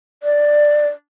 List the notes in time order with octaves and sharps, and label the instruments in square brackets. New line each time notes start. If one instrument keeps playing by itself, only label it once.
[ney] D5